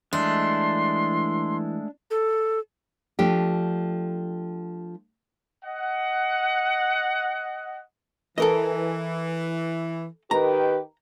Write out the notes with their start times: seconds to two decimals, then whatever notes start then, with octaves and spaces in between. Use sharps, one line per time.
0.13 E3 G#3 A3 D4 C6
2.11 A4
3.19 F3 A3 D4 G4
5.64 D#5 F#5
8.38 E3 A4 A#4 D#5
10.31 D#3 G4 B4 A#5